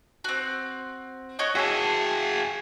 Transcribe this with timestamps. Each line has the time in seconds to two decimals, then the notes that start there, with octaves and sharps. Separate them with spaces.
0.24 C4 F#4
1.39 F#4 C#5 D#5
1.55 F#4 G#4 E5 A5